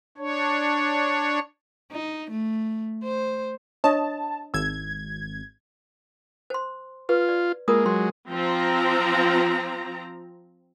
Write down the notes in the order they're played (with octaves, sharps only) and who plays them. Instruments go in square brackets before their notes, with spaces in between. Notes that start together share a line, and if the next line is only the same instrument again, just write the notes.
[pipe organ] D4 C#5
[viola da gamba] D#4
A3
C5
[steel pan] D4 C#5 D#5 [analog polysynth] A5
[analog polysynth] G#1 G#6 [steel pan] E6
[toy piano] C5 C6
[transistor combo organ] F4 [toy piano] B4
[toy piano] D5
[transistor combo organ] G#3 A#3 [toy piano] F4 A#4 D#6
[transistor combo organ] F#3 G#3 [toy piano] C6
[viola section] F3 C4 A#5